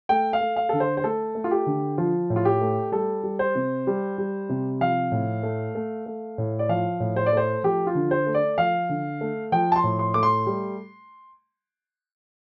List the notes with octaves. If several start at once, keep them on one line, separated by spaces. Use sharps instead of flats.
A3 G5
F5
A3
F5
D3 A4
C5
C5
A3 A4
A3
F4
G4
D3
F3 F4
A2
F4
G4
A3
G3 A4
G3
C5
C3
G3
G3
C3
F3 F5
A2
A3
A3
A3
A2
D5
F3 F5
A2
C5
D5
A3 C5
F3 G4
F4
D3
C5
A3
D5
F3 F5
D3
A3
F3 G5
A5
C6
A2
C6
A3 D6
C6
G3